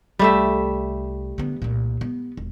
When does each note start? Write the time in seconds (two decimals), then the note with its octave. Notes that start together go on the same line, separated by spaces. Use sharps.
0.19 C2 G3 A3 E5
1.38 D3 B3
1.62 C2 A#2
2.01 B3
2.37 E1